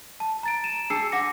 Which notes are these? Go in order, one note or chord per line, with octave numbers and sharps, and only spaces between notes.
A5
A#5 A6 D7
D#7 E7
D4 G#4 A5 E6 C7 C#7
D4 F#5 D6 A#6 C#7